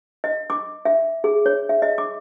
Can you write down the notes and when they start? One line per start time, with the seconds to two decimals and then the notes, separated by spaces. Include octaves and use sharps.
0.24 D#5
0.50 D6
0.85 E5
1.24 G#4
1.46 C#5
1.69 E5
1.82 D#5
1.98 D6